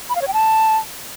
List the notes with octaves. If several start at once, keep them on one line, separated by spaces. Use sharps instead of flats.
B5
F5
C#5
G5
A5